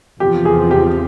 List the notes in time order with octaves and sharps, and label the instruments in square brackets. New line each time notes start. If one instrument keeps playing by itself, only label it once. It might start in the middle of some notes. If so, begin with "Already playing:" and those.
[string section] E2 C3 F3 [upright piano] G4
[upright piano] G#4
G4